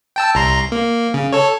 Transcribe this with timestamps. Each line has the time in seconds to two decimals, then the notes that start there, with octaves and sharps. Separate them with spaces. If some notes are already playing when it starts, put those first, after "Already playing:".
0.16 G5 A5 E6
0.35 C2 A#5 C6
0.72 A#3
1.14 C#3
1.33 A4 C#5